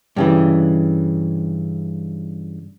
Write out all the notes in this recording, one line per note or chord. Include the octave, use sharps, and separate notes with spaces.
G2 C#3 E3